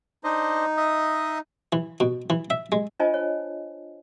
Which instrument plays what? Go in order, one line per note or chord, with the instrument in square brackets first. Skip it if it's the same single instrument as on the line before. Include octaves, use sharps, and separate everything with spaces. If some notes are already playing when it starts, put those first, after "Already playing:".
[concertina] D4 C5 D#5 [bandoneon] D#4
[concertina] D#5 E5 D#6
[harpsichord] E3
B2
E3
E5
G#3
[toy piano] D4 F4 C5 D#5 G#5 A5
C#5